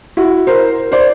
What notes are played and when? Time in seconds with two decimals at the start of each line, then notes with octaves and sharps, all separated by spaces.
0.17 E4 F#4
0.47 A#4 C5
0.92 C5 D5